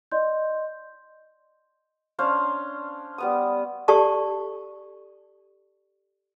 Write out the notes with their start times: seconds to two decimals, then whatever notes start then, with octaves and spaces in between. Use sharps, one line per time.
0.12 D5 D#5 C6 G6
2.19 C#4 D4 C5 F5
3.18 G3 B3 D#6
3.88 G4 A4 D5 A5 C#6